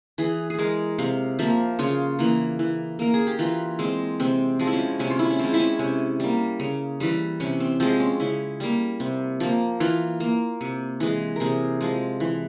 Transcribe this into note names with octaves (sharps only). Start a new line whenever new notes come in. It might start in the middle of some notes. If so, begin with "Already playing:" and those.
E3 G#4
G#4
G#3 A#4
C3 F5
F3 A#3 E5
C#3 F4
E3 A#3
E3
A#3 A#4
G#4
G4
E3 F4
G#3 C4
C3 C4
F3 G#3
E4
C#4
C3 C#4
F4
E4
C#4
F3 G#3 C4
E4
C#4
C3 C#4
G3 A#3
C#3
E3 G3
C3 C#4
C4
F3 G#3 C4
C#4
C#3 E4
G3 A#3
C3
F3 A#3
E3 F4
A#3
C3
E3 G#3
C3 G#4 A#4
F3 G#3
E3